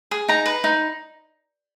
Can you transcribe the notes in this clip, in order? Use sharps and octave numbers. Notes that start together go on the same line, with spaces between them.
G#4
D#4 A#5
B4
D#4